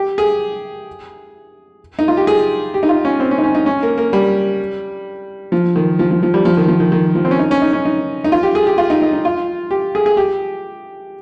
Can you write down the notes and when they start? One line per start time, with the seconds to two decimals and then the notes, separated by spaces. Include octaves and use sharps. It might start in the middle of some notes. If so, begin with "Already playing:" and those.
Already playing: G4
0.18 G#4
1.99 D#4
2.08 F4
2.17 G4
2.27 G#4
2.74 G4
2.83 D#4
2.89 F4
3.05 C#4
3.20 C4
3.31 C#4
3.38 D#4
3.44 C#4
3.55 D#4
3.66 C#4
3.83 A#3
3.98 A#3
4.13 G3
5.52 F3
5.76 D#3
5.99 F3
6.11 F3
6.23 F3
6.34 G3
6.45 F3
6.57 D#3
6.68 F3
6.80 D#3
6.92 D#3
7.15 F3
7.25 C4
7.31 C#4
7.39 D#4
7.51 C#4
7.62 D#4
7.73 C#4
7.85 D#4
8.24 D#4
8.32 F4
8.43 G4
8.55 G#4
8.67 G4
8.78 F4
8.90 D#4
9.02 D#4
9.13 D#4
9.25 F4
9.71 G4
9.95 G#4
10.06 G#4
10.17 G4